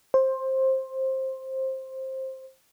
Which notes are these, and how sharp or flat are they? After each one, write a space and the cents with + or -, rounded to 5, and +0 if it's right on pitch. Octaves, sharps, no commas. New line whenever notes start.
C5 +15